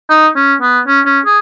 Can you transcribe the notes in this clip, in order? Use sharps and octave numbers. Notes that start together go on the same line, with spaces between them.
D#4
C#4
B3
C#4
C#4
G#4